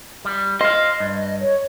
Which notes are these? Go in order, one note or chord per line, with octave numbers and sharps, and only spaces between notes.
G3
C5 D#5 F5
G2
C#5